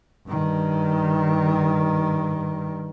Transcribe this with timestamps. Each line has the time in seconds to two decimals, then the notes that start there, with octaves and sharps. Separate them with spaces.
0.28 G2 D#3